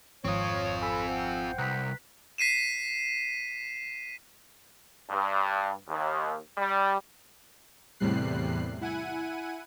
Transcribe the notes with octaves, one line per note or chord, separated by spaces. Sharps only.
G#1 F2 C4 F4 C#5 C#6 D#6
A4 G#5 B5 E6
C5 F#5 G5
C2 B4 A#5 C6 F#6 B6
B6 C7 D#7 E7
G2
D#2
G3
E2 A2 C3 G3 F#6 C7
E4 F#5 G#5 D#7